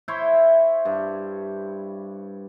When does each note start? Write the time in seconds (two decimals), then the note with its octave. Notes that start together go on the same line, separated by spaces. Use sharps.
0.08 E4 C5 C#5 E5
0.85 G2